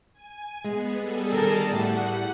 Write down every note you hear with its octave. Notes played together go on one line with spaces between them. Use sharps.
G#5
G#3 B3
G3 G#4 A4
D3 D#3 A#4 A5
A2 G3 F#5